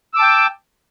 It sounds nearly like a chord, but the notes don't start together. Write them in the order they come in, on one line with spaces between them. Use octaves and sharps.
E6 D6 A5 G5